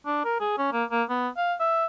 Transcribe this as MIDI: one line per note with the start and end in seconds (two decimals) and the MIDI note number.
0.06 0.22 62
0.24 0.36 70
0.40 0.55 68
0.58 0.70 61
0.73 0.84 58
0.91 1.03 58
1.09 1.29 59
1.37 1.54 77
1.60 1.86 76